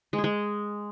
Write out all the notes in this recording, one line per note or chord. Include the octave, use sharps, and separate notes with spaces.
G#3
G#4
G#3